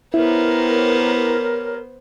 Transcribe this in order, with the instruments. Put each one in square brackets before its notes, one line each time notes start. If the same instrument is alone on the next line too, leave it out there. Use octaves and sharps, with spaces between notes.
[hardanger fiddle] B3 C5 [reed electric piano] E4 [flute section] G4 A#4 C#5